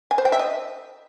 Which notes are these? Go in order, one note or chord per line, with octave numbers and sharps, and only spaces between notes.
G#5
C5
G5
E5
D#5